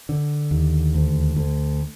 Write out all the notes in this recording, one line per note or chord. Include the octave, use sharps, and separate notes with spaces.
D3
D#2
D2
D2